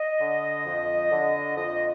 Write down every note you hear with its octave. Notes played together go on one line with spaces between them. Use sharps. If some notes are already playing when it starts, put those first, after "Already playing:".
Already playing: D#5
D3
F2
D3
F2 D#5